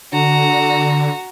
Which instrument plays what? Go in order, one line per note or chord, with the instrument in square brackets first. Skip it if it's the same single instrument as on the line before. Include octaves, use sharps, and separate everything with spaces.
[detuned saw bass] D3 [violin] F#4 A#5